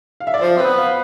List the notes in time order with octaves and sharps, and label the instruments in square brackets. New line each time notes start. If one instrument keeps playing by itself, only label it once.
[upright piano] F5
E5
D5
[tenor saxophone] F3 [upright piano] C5
[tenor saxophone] C4 [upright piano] B4
[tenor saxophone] B3
[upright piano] F5